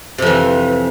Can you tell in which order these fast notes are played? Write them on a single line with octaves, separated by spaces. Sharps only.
C3 F2 E3